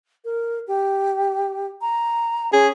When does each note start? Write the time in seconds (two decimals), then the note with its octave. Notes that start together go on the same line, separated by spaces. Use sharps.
0.25 A#4
0.67 G4
1.81 A#5
2.53 C#4 G#4